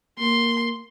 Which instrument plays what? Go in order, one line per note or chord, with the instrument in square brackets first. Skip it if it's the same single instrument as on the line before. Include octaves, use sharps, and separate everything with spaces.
[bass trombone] A#3 [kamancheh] C6